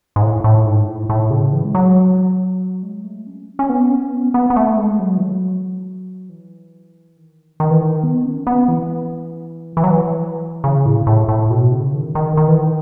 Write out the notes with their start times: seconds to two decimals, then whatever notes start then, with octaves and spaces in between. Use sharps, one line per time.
0.16 G#2
0.22 A2
0.44 A2
0.66 G#2
0.87 A2
1.10 A2
1.31 C#3
1.53 E3
1.65 G#3
1.75 F#3
2.83 G#3
3.04 A3
3.27 C#4
3.59 C#4
3.69 B3
3.91 C#4
4.13 B3
4.34 B3
4.50 B3
4.56 A3
4.78 G#3
4.99 F#3
5.17 E3
5.21 F#3
6.29 E3
7.17 D#3
7.60 D#3
7.71 E3
7.82 D#3
8.03 B3
8.25 C#4
8.47 B3
8.68 E3
9.77 E3
9.84 F#3
9.91 E3
10.64 C#3
10.86 A2
11.07 A2
11.28 A2
11.50 B2
11.72 C#3
11.94 D#3
12.15 D#3
12.37 D#3
12.48 E3
12.60 D#3